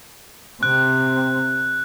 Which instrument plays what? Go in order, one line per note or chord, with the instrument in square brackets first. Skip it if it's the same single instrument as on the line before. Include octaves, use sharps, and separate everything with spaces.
[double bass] C3 C4 [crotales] F#6